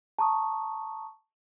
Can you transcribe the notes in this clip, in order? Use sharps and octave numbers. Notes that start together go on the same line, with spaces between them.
A5 A#5 C#6 D#6